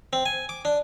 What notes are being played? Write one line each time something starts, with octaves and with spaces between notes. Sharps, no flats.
C4
G#5
D6
D4